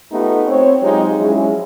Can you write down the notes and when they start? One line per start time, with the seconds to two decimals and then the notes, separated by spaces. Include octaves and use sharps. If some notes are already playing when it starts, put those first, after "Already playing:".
0.12 A3 B3 D#4 F4 G4
0.47 C4 C#5
0.82 F#3 G#3 C4 D#4 F4 G4
1.18 F3 F#3 G#3 C#4 E4 G#4